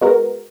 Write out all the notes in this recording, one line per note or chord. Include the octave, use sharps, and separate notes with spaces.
G#3 B3 F#4 A#4